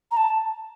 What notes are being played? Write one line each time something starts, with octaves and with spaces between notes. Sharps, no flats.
A#5
A5